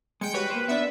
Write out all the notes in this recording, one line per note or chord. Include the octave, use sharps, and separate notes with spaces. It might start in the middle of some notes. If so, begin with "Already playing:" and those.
G#3 G5 C#7
F#4 G4 B4 C#5
A#3 C5
B3 D4 E5